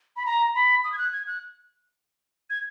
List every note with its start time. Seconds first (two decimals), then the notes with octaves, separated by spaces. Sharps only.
0.16 B5
0.26 A#5
0.55 B5
0.84 D#6
0.92 G#6
0.98 F#6
1.13 G#6
1.27 F#6
2.50 G#6